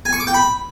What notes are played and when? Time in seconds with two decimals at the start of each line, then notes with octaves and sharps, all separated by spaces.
0.05 G#5
0.13 C#6
0.20 D6
0.27 G5
0.34 B5